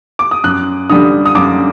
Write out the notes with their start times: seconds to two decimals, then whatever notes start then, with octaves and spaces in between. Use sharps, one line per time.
0.19 D6
0.31 D#6
0.44 F#2 F#6
0.90 D3 G3 D#6
1.26 D#6
1.35 F#2 D6